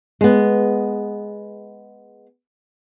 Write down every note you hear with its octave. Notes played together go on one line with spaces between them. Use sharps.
G#3 B3